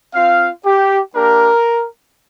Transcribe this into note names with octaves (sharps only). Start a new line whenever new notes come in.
C4 F4 F5
G4
A#3 D4 G4 A#4